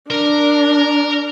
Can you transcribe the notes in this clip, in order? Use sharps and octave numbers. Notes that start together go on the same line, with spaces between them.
D4 A#4